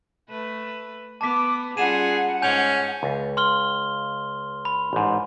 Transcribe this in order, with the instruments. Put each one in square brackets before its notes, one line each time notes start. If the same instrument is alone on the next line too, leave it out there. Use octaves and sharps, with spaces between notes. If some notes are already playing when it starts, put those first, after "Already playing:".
[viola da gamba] A3 B4
[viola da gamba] B3 [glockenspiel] A5 B6 [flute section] D6
[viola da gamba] G3 C#4 F4 [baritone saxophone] G#4 [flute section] F#5 [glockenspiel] D#7 E7
[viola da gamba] G#2 G#4 [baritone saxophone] C#4 [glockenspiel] G#5 G6 F7
[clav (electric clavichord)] C#2
[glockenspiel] C6 F6 G7
B5
[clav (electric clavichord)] A1 G#2